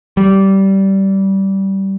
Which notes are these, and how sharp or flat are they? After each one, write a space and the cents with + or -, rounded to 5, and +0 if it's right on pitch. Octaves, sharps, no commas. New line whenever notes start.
G3 -15